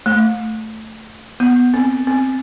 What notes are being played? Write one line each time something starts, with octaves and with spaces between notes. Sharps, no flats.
A3
B3
C4
C4